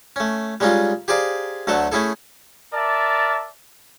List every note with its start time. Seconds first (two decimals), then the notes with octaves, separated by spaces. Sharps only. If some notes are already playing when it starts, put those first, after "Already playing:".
0.16 A3 C#4
0.60 G3 G#3 C#4 D#4 F4
1.08 G4 G#4 C5 D5 F5 A#5
1.67 D2 D3 F#3 A3 A4 A5
1.92 A3 C#4 E4 G#4 A4
2.74 A#4 D5 E5 A5